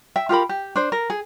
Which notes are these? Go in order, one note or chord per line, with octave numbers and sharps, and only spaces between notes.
E5 G5
F4 G4 A#4 B5
G4
D4 C5
A#4
G#4